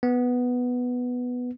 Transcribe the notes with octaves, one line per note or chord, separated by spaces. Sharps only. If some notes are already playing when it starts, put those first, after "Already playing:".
B3